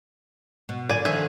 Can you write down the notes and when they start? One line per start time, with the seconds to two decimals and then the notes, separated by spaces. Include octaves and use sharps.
0.69 B2
0.89 A#2 D3 D5 G#5
1.05 D3 D#3 F3 E5 G#5